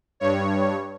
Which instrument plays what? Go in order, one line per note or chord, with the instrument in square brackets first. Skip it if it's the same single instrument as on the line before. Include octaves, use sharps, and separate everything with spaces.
[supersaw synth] G2 C#5